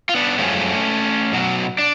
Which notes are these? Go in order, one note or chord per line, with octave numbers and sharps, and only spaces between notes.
F4
B3 D4
F#2 F3 G#3 A3 C#4
B2 F#3
D4